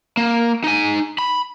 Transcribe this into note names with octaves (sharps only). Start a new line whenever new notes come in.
A#3
D#4 G#5
B5